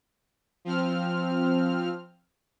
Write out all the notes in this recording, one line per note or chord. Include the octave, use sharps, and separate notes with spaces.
F3 C4 F6